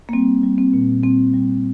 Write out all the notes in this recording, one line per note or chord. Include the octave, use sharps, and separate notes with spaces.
A#3
G3 C4
G3
C4
A#2
G3 C4
G3